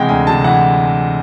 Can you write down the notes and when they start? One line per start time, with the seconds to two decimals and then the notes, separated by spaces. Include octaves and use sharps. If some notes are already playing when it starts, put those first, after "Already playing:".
Already playing: C3 E3 G#3 F#5 G5
0.09 D2 G#5
0.27 C3 A5
0.44 E3 F#5